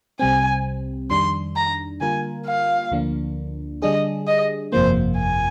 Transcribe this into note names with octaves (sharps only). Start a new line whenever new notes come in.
C2 C3 G3 C4 G#5
F2 D#3 G3 D4 C6
A#5
D3 G3 A#3 F4 A#4 G#5
F5
D2 D3 F3 A#3 D4
D3 G3 D4 G#4 D#5
D#5
G1 F2 C3 F3 A#3 C5
G#5